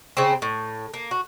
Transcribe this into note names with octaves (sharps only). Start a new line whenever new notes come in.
C#3 C4
A2
A#3
F#4